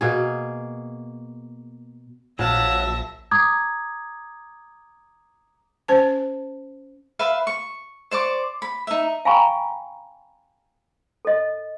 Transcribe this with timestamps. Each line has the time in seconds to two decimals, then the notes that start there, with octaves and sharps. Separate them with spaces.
0.01 B2 A#3 G#4
2.39 A#1 F#3 E5 F5 A5 A#6
3.31 A#5 D6 D#6 G#6
5.88 C#4 C5 A5
7.19 B4 E5 F5
7.47 C#6
8.11 C5 D5 C#6 D6
8.62 B5
8.87 D#4 E5
9.25 F5 G5 G#5 A#5 B5 C#6
11.25 A4 D#5